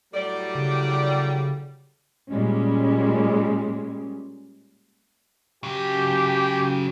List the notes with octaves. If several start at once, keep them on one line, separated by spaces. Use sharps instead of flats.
A2 F#3 G3 D5
C#3
A#2 G3 G#3 C#4
C#3 F#3 G4